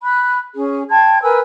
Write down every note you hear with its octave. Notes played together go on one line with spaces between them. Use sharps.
B5 F#6
C#4 G#4
G5 A5 C6 G#6
A#4 B4 G#5 E6